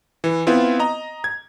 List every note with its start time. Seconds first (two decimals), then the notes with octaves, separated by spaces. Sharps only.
0.24 E3
0.47 B3 C4 E4 F4
0.80 D#5 A#5
1.24 G#6